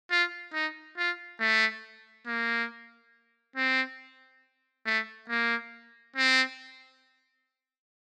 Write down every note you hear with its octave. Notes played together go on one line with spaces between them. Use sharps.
F4
D#4
F4
A3
A#3
C4
A3
A#3
C4